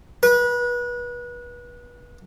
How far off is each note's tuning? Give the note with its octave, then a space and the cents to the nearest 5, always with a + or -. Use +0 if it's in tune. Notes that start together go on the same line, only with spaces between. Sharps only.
B4 -30